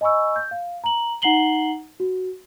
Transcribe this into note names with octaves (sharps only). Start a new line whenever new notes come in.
D#5 G#5 B5 C#6 E6
G6
F5
A#5 F#7
D#4 F#5 A#5 C7 F#7 G7
F#4